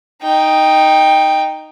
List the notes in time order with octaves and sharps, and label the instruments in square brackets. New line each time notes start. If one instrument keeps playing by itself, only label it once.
[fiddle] D#4 G5